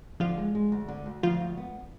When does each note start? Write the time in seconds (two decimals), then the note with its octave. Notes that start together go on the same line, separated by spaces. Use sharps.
0.20 D3 F3 F4
0.37 G#3
0.55 G#3
0.72 D2
0.88 D3
1.06 D2
1.23 D2 F3 F4
1.40 D2
1.57 B3